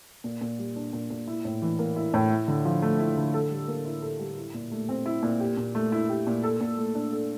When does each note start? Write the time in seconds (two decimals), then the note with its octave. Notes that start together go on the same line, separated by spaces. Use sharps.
0.24 A#2
0.41 A#2
0.59 G3
0.76 D4
0.93 A#2
1.10 A#2
1.28 E4
1.45 A2
1.62 E3
1.79 A#3
1.96 E4
2.14 A2
2.30 E4
2.48 D3
2.65 F3
2.82 A3
2.99 E4
3.17 D3
3.34 A4
3.51 G3
3.68 A#3
3.86 E4
4.02 A4
4.20 G3
4.37 E4
4.54 A#2
4.71 A3
4.89 C4
5.06 E4
5.23 A#2
5.40 G4
5.57 A#2
5.75 A3
5.92 E4
6.09 G4
6.27 A#2
6.43 A4
6.61 A#2
6.78 A3
6.95 D4
7.12 A4